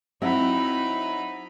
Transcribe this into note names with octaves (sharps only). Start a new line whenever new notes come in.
F#3 C4 D#4 E4 F#4 B5